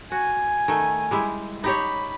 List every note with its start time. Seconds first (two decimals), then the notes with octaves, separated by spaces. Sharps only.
0.12 F#4 G#5
0.68 D#3 A3
1.11 G3 G#3 E4
1.64 D#4 G4 C#5 B5